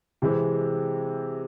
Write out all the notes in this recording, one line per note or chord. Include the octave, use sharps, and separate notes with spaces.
C3 E3 G#3 C4